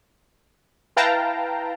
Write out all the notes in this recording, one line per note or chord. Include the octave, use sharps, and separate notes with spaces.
E4 B4 F5 G5 A5 A#5